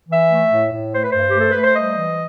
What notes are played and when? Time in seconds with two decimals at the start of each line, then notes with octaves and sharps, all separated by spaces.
0.09 E3 E5
0.30 A3
0.51 A2
0.72 A2
0.92 A3 C5
1.01 B4
1.10 G2 C5
1.27 G4
1.34 A3 A4
1.51 A3 B4
1.63 C5
1.76 G3 D#5
1.97 E3